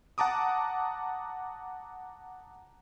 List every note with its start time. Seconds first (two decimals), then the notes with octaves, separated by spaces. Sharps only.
0.18 F#5 A5 A#5 D6 D#6